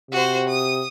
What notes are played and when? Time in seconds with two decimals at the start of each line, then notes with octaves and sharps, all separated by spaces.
0.11 C3 F#4 C5
0.48 D#6